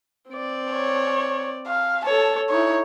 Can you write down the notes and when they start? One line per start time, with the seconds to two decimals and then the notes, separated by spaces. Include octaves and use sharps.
0.30 C4 D5
0.72 C#5
1.67 F5
2.05 A4 C#5 A5
2.50 D#4 E4 C#5